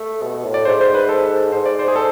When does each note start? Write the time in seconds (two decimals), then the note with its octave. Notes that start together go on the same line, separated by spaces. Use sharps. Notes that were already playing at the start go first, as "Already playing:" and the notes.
Already playing: A3
0.23 B2
0.45 A2
0.54 D5
0.65 G#2 C5
0.81 C5
0.94 B4
1.09 A4
1.52 G#2 C5
1.66 D5
1.79 C5
1.88 G#4
1.96 A4